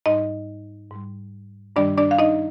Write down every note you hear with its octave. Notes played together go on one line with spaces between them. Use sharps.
G#2 G3 D#4 D#5
G#2 G3
G2 D#3 G3 D4 D5
D4 D5
F5
D#4 D#5